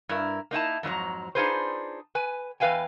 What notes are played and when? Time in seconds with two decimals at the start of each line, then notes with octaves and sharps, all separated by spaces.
0.09 G2 E4 A#4
0.51 A#3 D#4 E4 A5
0.83 F2 G#2 F#3 A#5
1.35 D4 D#4 F4 G#4 B4 C5
2.15 B4 G#5
2.60 E2 B4 F5 G5 G#5